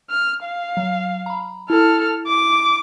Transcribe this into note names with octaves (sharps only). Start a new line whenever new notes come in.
F6
F5
F#3
A#5 B5
E4 A4 F6
D6